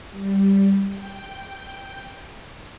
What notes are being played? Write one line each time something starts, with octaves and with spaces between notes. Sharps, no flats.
G3
G5